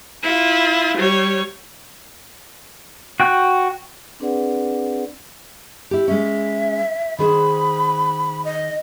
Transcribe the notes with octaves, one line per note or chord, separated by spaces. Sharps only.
E4 F4
G3 C#5
F#4 G5 F#6
C4 D4 G#4 B4 D5 F#5
E4 G4
G#3 C#4 E5
D#3 G#4 C5 B5
D#5